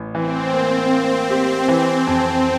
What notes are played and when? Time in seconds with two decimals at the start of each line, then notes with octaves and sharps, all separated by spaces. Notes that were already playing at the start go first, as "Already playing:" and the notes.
Already playing: A1
0.14 E3 C4
0.53 A#3
0.92 A#3
1.30 G4
1.68 E3
2.07 F2